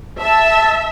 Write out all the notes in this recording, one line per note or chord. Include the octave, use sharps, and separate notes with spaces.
E5 A5